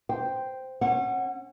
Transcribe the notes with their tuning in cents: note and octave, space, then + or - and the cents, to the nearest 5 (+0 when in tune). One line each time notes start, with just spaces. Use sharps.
C5 -10 G5 +0
C#4 -35 F#5 +0